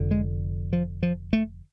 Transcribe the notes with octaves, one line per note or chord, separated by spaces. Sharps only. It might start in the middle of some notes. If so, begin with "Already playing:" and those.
Already playing: F1 F2 D3
G#3
F3
F3
A3